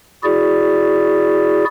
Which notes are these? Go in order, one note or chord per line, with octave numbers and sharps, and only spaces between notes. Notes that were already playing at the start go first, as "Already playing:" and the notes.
E4 F#4 G#4 D5